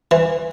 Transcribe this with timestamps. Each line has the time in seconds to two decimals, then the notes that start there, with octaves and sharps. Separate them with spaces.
0.11 E3